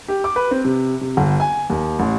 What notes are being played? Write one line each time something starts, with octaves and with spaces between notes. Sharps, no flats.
G4
D6
B4
C4
C3
C3
G1
G#5
D#2
A1